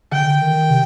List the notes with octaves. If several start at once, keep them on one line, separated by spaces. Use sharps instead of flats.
D3 G5
D3
D#3
D#3
C3